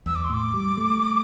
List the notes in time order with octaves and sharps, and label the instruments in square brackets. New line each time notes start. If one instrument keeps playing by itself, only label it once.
[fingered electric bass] E2 [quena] E6
[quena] D6
C6
[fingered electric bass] A2 [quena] D6
[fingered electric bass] G3
A3